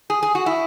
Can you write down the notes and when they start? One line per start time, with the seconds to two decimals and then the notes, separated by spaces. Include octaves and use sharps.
0.10 G#4
0.23 G#4
0.35 F#4
0.46 E4